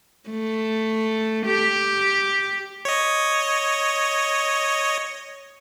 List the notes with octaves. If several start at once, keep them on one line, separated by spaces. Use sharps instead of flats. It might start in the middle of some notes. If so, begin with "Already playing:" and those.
A3
G4
C#5 D#5